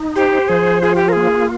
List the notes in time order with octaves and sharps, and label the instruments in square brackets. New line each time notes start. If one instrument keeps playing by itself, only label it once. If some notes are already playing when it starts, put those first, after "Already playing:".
Already playing: [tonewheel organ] D#4
[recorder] G4 [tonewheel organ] C5
[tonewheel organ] F3 [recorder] G#4
[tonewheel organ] F4 [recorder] G#4
[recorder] G4
A#4
[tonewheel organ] A#3 [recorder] G#4